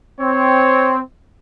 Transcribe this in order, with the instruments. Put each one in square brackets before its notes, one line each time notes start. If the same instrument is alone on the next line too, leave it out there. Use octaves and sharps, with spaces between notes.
[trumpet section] C4 [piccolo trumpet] C#5